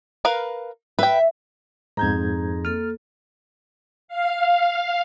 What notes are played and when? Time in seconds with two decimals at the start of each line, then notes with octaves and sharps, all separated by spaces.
0.25 A#4 B4 F5
0.99 B4 E5 G5
1.97 F2 G#2 C4 D#4 G#4 A#5 G6 G#6
2.65 A#3 A4 F6
4.08 F5